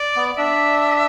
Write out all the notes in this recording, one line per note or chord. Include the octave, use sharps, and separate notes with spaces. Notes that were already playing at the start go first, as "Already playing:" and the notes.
Already playing: D5
B3
D4 E5